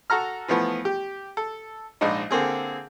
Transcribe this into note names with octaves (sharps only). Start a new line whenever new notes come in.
F#4 A4 A#5 F6
E3 F3 A3 B3
G4
A4
A#1 G#2 D4 D#4 D#5
D3 A#3 C4 G#4